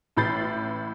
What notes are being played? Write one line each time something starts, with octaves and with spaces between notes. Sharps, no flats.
A1 A2 B5 G6 A6 C7